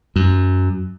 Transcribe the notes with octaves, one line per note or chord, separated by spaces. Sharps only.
F#2